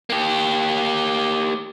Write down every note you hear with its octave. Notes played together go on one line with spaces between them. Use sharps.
A#3 G4